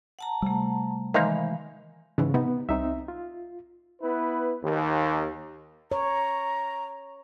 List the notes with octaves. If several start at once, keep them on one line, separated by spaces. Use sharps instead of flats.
F#5 A5 A#5
C3 G3 A3
D#3 E3 G#3 A#3 D#4 C5 F5 B5
G#2 C#3 E3
C3 B3 D#4
C2 C4 D#4 E5
F4
B3 E4 B4
D#2
C#5 A#5